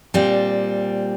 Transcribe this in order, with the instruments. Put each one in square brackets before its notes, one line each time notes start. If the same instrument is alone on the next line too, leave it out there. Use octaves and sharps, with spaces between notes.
[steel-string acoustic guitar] A#2 G3 C4